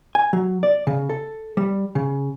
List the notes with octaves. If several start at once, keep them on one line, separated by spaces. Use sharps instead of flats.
G#5
F#3
D5
C#3
A4
G3
C#3